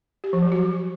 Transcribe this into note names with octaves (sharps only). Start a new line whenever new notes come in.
G4
F3
F#3
F#4